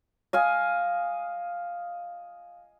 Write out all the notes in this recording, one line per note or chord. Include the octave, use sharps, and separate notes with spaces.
D#5 F5 G#5